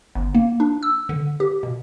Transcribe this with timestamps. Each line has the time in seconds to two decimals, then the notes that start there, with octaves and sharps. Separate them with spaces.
0.15 G1
0.35 A#3
0.60 D4
0.83 E6
1.09 D3
1.40 G4
1.63 B2